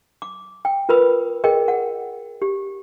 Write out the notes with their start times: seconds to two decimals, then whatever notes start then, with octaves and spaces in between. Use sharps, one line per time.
0.22 D6
0.65 G5
0.89 F4 A#4 B4 B5 D#6
1.44 G#4 A#4 D#5 G5
1.68 F#5
2.42 G4